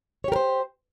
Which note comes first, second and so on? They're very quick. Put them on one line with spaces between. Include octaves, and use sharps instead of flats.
C#5 G4 A#4 C5